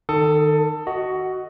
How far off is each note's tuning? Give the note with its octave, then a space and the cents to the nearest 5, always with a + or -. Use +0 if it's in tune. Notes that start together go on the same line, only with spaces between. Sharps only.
D#3 -20 A4 +20 D#6 +25
F#4 +15 D#5 +5